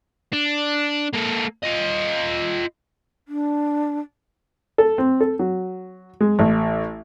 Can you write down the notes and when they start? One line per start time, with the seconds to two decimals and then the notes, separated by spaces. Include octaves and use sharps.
0.33 D4
1.14 A#3 A4
1.64 F4 D#5
3.28 D4
4.78 A4
4.98 C4
5.20 A4
5.39 F#3
6.21 G#3
6.39 A1